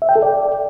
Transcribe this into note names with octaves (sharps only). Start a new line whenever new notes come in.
E5
G5
A4
D5